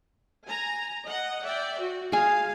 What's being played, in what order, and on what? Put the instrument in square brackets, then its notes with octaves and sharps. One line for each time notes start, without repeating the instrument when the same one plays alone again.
[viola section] G#5 A#5
D#5 F#5
D5 E5 G5
F#4
[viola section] G#3 F5 [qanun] G#4 G#5